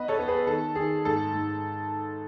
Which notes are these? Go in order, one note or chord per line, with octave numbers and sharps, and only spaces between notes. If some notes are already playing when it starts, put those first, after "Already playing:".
Already playing: B3 B4 D#5
A4 C#5
B3
G#4 B4
D#3 A4
D#3 G#4
G#2 A4
G#2